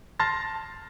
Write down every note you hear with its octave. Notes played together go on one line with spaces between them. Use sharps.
A5 C6 F6 A6 A#6